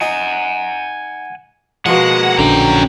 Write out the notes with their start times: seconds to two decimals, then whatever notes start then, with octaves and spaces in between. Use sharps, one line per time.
0.01 D#4 F#5 G#5
1.86 B2 F3 G#3 A#3 F#5
2.39 A#1 D3 F#3 C#4 G5 A#5